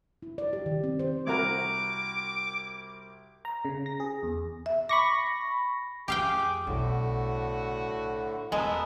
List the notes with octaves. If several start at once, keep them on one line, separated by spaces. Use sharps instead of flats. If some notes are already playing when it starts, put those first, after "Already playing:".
E4
D5
G4
D#3
C4
C5
C2 F#4 A#4 D6
A#5
C#3
A#6
G#4
E2
E5
B5 C#6 D6 A#6
F2 G4 G#4 F5 G5 D6
B1 A2 D3 F#4
E2 G#3 B3 A4 A#4